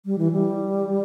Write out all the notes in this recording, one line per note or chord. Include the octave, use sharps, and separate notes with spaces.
G3
E3
G3